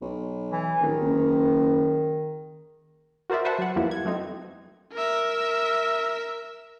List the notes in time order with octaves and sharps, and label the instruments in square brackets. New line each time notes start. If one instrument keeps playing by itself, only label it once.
[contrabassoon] B1
[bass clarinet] E3
[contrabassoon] D1 [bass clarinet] D#3
[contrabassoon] F#1
[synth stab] F#4 A#4 C5 D5 E5
B4 C5 E5 F#5 A5
F#3 F#5
F2 F3 G3 A#3 B3 E4
G#6
F#3 A3 C4 D#4
[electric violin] A#4 E5